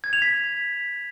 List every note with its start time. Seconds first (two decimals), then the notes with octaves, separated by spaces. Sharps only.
0.04 G#6
0.13 F7
0.22 B6